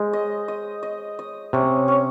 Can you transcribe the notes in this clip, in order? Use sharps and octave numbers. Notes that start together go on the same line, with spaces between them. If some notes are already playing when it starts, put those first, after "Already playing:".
Already playing: G#3 C5
D#5
D#5
D#5
D#5
C3 C#4
C#4